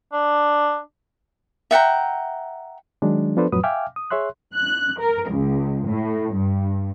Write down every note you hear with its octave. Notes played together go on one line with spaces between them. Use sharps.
D4
E5 F#5 G5 A#5
D#3 F#3 G#3 D4
F3 B3 D4 A4 B4 C5
F2 A2 F#3 B4 D#6
E5 F5 G5 G#5 D6 F6
D#6
G#4 C#5 E5 C6 F#6
F#6
A#4
C#2
A2
G2